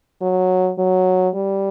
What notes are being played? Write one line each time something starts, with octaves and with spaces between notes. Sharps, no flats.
F#3
F#3
G3